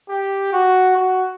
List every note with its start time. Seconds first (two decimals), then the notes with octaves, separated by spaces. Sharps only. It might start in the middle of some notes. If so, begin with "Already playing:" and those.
0.09 G4
0.53 F#4
0.96 F#4